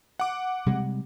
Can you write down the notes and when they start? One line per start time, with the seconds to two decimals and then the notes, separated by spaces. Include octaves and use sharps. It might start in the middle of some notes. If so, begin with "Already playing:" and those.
0.20 F#5 D6
0.66 C3 G3 G#3